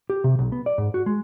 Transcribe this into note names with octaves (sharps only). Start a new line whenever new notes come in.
G4
C3
B1
B3
D5
G#2
F#4
G#3